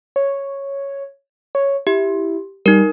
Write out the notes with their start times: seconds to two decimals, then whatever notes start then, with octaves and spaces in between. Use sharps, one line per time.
0.16 C#5
1.55 C#5
1.87 E4 G4
2.66 G3 D#4 A#4